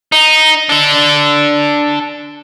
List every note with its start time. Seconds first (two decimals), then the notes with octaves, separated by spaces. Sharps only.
0.12 D#4
0.69 D4 A4